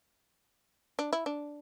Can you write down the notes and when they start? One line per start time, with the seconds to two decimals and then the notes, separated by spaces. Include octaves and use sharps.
0.99 D4
1.13 E4
1.26 D4